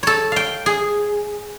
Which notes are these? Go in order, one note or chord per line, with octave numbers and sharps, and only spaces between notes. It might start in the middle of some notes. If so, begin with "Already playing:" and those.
A4 C#5
F5 G5
G#4